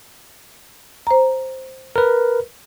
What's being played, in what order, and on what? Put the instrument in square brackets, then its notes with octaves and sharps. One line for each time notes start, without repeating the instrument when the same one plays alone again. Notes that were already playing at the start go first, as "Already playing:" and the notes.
[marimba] C5 A#5
[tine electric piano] A#4 B4